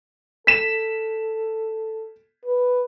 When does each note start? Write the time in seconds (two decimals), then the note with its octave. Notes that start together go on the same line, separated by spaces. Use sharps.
0.47 A4 B6 E7
2.45 B4